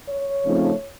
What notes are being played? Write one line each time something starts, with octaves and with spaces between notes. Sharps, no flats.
C#5
C#3 F3 A3 C4 D#4